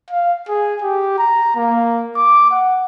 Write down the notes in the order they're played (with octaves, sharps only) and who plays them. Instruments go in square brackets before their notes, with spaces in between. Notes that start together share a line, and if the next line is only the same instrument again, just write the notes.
[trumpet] F5
G#4
G4
A#5
A#3
D6
F#5